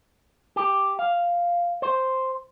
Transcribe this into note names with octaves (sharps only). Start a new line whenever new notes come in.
G4
F5
C5